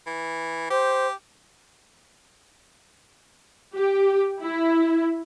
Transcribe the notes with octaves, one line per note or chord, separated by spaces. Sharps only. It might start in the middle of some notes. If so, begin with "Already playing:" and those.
E3
G4 C5
G4
E4